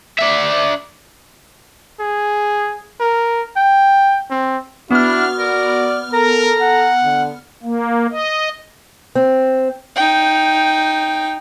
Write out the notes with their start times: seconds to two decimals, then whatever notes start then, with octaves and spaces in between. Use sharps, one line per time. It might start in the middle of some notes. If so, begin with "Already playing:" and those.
0.19 D4 E5
1.99 G#4
3.00 A#4
3.56 G5
4.30 C4
4.91 B3 D4 E4 F#4 F6
5.39 A#4 D5
6.13 A4 A#4 A#5
6.62 F#5
7.03 D3
7.63 A#3
8.11 D#5
9.15 C4
9.96 D#4 G5